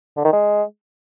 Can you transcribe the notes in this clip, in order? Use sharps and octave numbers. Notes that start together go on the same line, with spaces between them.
D3
D#3
G#3